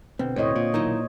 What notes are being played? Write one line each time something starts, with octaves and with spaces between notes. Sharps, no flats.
B2 D3 C4
D2 A2 C5 C#5 D#5
A#2 F4
B1 D#3 D#4 E4 D#5